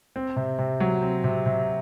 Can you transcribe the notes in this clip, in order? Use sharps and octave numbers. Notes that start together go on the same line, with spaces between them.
C4
C3
C3
F#3
C4
C3
C3